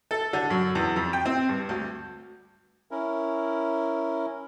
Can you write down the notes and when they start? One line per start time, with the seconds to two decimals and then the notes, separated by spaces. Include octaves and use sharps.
0.11 A4
0.33 D3
0.50 F#2
0.75 E2
0.96 F2
1.13 G5
1.25 C4
1.49 G2
1.69 D2
2.91 C#4 E4 A#4